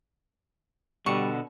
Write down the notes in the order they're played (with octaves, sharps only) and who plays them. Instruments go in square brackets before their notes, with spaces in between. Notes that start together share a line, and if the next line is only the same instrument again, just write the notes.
[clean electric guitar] B2 D3 [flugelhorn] G3 [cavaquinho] C#6